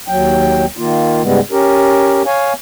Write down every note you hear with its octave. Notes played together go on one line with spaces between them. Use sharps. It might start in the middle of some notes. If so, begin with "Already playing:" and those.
D#2 F#3 G5
D#3 A#3 F4
G#2 C#3 G3 G#3 B3
C#4 G4 A#4
C#5 F5 G#5